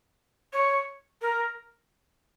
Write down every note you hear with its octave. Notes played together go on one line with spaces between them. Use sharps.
C#5
A#4